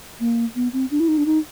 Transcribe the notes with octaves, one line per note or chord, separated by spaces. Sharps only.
A#3
B3
C4
D4
E4
D#4
D4
D#4